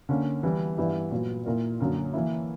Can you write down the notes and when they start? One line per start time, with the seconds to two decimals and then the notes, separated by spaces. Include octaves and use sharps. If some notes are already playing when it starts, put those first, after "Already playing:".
0.09 D3 A#3 C#4
0.43 E3 G3 B3
0.77 G2 E3 B3 E4 G4
1.11 A#2 F#3 B3 F#4
1.46 A#2 A#3 E4 A#4
1.80 F#2 D3 A#3
2.13 E3 A#3 E4